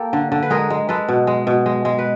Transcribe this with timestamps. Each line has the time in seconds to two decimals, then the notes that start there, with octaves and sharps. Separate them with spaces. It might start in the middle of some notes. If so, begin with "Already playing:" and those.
Already playing: A#3 G4 A4
0.13 D3
0.32 D3
0.42 B4
0.50 G#3 G#4 A#4
0.70 G#3
0.89 G#3 A4 B4
1.08 B2
1.27 G#3
1.47 B2
1.66 G#3
1.85 G#3
1.99 B4